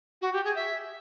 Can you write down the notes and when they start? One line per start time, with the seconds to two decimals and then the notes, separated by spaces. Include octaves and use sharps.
0.22 F#4
0.33 G4
0.44 G#4
0.56 E5